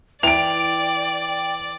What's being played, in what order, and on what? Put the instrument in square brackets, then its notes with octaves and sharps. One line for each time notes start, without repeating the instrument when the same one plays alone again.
[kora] E3 [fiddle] D5 [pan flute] G5 [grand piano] D7 F7